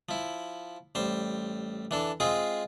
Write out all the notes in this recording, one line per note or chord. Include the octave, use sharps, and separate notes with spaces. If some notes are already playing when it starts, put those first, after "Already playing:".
F3 E4
A1 G3 C5
E3 D4 A4
G#3 C4 F4 G#4